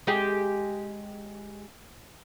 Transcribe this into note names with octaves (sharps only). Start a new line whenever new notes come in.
G#3 G4 G#4